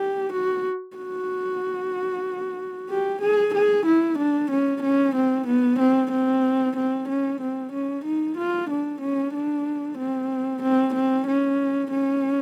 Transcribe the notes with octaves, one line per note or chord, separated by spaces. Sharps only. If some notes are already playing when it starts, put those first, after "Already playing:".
Already playing: G4
F#4
F#4
G4
G#4
G#4
E4
D4
C#4
C#4
C4
B3
C4
C4
C4
C#4
C4
C#4
D#4
F4
D4
C#4
D4
C4
C4
C4
C#4
C#4